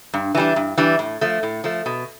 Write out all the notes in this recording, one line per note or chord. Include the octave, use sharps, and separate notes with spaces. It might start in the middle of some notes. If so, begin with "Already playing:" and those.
G2
E3 G3 D4
G2
E3 G3 D4
A2
F3 A3
A2
F3 A3
B2